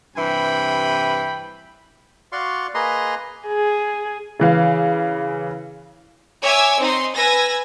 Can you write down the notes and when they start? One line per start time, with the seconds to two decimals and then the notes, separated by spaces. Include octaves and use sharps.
0.17 G2 C3 E3 G5 B5
2.32 F#4 D5 F5 C6 C#6
2.75 A#3 G#4 B4 D#5 A#5 C6
3.47 G#4
4.40 C#3 E3 F5
6.42 C#5 E5 G#5 D6 E6
6.80 C4 D#4 C6
7.16 B4 G#5 E6 G#6 A#6